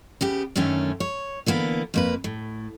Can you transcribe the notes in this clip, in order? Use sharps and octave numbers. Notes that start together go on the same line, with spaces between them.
C#3 B3 G4
F#2 D3 D#3 A3 C#4
C#5
D3 E3 A#3 B3
F2 A#3 B4
A2